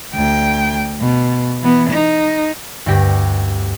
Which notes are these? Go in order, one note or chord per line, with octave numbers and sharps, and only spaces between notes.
D2 G5
B2
E3 B3
D#4
D2 G2 G4 A#6